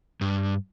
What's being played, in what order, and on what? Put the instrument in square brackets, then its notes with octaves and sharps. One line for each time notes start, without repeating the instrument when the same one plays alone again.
[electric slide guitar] G2